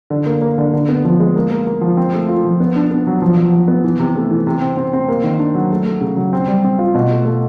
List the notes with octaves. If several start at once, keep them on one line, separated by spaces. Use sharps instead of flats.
D3
A#3
A#3
D3
D3
B3
F3
G#3
A#3
A#3
A#3
F3
C4
A3
F4
F3
B3
D4
B3
F#3
F3
F3
F3
B3
E3
C3
A3
E3
C3
C4
C4
C4
A#3
D#3
D4
F#3
A3
A3
C#3
F#3
C4
G3
C4
F4
B2
A3
A3